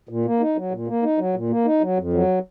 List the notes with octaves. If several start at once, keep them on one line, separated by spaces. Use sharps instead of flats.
A#2
A#3
D#4
F#3
A#2
A#3
D#4
F#3
A#2
A#3
D#4
F#3
F2
F#3